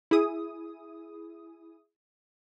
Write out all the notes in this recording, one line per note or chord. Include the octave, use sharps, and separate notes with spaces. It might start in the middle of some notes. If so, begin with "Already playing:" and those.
E4 G#4 D#6